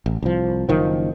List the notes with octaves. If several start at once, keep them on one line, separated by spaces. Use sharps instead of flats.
A1
C2 F3
F#1 D#3 F3